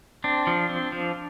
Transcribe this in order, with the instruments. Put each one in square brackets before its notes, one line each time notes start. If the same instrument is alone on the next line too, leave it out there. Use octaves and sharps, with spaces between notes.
[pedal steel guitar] C4 D4
F3
C4
F3